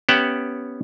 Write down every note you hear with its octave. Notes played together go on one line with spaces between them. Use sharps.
B3 C#4 G4 E5 F#5 G5